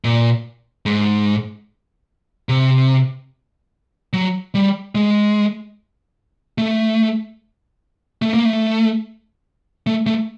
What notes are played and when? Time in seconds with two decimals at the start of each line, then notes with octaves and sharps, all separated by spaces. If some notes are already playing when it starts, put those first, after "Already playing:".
0.04 A#2
0.86 G#2
2.49 C3
4.13 F#3
4.55 G3
4.95 G#3
6.58 A3
8.22 A3
8.34 A#3
8.45 A3
9.87 A3
10.07 A3